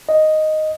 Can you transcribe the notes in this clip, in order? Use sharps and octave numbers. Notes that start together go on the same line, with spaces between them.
D#5